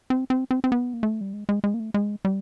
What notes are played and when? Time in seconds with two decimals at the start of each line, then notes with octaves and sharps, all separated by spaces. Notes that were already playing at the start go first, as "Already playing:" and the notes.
0.10 C4
0.30 C4
0.51 C4
0.64 C4
0.72 B3
0.94 A#3
1.03 A3
1.21 G3
1.33 G#3
1.49 G#3
1.64 G#3
1.74 A#3
1.80 A3
1.94 G#3
2.25 G3